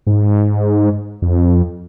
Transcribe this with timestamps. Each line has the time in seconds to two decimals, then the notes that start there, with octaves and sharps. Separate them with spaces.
0.07 G#2
1.22 F2